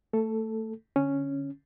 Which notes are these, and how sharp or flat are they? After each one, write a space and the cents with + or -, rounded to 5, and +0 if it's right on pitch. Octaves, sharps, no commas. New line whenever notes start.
A3 +20 A4 +0
D3 +0 C#4 +0